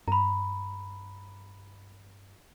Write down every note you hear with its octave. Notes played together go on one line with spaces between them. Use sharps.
G2 A#5 B5